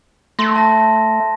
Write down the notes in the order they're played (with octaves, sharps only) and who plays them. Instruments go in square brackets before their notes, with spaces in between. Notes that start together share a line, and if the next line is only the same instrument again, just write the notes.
[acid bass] A3 [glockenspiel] C6 A#6
[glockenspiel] A5 A#6